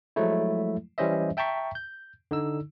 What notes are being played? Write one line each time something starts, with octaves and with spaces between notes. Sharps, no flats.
F3 F#3 G#3 A3 E4
E3 G3 C#4 C5 D#5 E5
E5 G5 A5 A#5 C#6 B6
G6
D3 D#4 E6